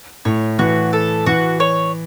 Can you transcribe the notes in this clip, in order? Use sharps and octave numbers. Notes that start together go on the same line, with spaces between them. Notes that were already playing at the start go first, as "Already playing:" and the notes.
A2 C#5
E3 F#4
A4
E3 F#4
C#5